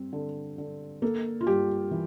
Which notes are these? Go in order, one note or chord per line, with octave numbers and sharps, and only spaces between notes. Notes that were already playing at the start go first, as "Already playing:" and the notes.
Already playing: G2 C4
D3
D3
A#3 A4
F4
G2 G4
E3